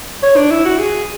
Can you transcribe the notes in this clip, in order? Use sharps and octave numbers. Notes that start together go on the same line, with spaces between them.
C#5
D4
E4
F#4
G#4